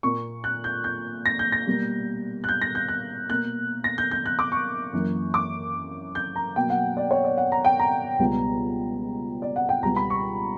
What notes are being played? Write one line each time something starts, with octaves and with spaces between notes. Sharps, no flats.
A#2 A#3 C#6
F#6
G6
G6
A#6
G6
A#6
B2 G3 A#3
F#6
G6
A#6
G6
F#6
B2 A#3 F#6
A#6
G6
G6
F#6
D6
C#6
F#2 E3 A#3
D6
G6
A#5
B2 F#3 A#3 G5
F#5
D5
C#5
D5
F#5
A#5
G5
A#5
C#2 B2 G3 B3
D5
F#5
G5
C#2 B2 G3 B3 A#5
B5
C#6